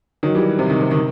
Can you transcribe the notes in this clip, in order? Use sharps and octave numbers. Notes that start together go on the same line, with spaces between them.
D#3 F#3
E3 G3
C3
D#3
C3
D#3